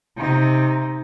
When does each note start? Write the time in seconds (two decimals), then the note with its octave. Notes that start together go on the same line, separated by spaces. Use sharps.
0.17 C3 D#4